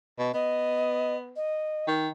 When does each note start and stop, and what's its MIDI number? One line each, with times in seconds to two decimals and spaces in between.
0.18 0.32 47
0.34 1.37 59
0.34 1.16 75
1.36 1.86 75
1.87 2.08 51